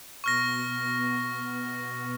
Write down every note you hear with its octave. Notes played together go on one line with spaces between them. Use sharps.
B2 B3 C#6 F6 A#6